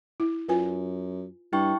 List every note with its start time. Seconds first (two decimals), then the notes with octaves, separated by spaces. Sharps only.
0.20 E4
0.48 F#2 F4 B4 G#5
1.53 G2 E4 G5 C#6